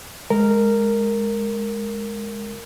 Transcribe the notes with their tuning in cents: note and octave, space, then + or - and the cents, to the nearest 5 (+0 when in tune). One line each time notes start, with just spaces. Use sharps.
G#3 +0 A#4 -10